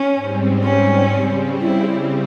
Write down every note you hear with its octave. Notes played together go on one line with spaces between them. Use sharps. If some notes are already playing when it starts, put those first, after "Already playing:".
Already playing: C#4
G#2 G3 C4
C#4
C#3 G3 C4
E4